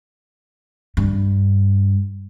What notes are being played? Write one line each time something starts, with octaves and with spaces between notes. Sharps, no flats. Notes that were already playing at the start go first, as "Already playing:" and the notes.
G2